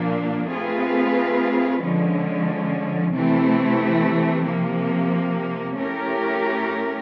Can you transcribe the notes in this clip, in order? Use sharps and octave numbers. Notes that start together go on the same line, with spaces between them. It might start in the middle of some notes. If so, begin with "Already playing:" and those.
Already playing: A#2 F3 A#3 D4
A3 C4 F4 G#4 B4
D3 F3 G#3 C#4
C3 E3 A3 C4 E4
C3 F3 A#3
A3 C#4 E4 G4 A#4